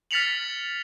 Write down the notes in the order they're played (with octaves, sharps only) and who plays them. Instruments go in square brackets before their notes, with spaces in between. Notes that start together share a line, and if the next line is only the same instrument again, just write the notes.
[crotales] F6 A6 B6 C#7 F7 F#7